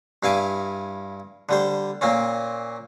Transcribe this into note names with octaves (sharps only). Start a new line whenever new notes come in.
G2 E4 F5 G#5 D6
D3 G3 C5
A#2 A#3 C4 C#4